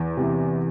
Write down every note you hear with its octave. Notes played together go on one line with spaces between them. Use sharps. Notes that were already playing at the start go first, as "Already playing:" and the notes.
Already playing: E2
C3 E3